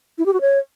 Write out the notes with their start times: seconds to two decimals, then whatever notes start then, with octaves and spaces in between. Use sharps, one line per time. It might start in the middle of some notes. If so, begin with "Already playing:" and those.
0.18 E4
0.26 G4
0.33 F#4
0.41 C#5